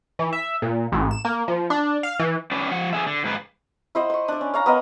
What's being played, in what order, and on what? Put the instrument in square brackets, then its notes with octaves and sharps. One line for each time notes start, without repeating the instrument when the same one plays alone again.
[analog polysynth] E3
E5
A#2
A1
E7
A#3
F3
D4
F5
E3
[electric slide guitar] C#4 D4 B4
F3 F#5
D3 G#4 E5
D3
G#2 A#3 G4 B4
[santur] E4 C5 D#5 F#5
C5 C#6
D4 D5
C#4
C#4 F5 A#5
B3 A#4 D#5